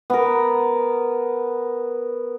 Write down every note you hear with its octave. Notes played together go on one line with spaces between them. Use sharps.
B3 A#4